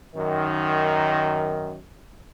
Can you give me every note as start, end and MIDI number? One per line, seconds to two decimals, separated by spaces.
0.15 1.79 42
0.15 1.79 51